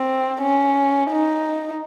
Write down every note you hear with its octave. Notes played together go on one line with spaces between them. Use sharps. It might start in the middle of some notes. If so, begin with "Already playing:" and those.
Already playing: C4
C#4
D#4